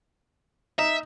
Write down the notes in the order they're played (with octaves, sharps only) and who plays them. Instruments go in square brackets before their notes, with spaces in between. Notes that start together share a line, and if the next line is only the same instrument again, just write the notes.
[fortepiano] D#4 [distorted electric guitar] E5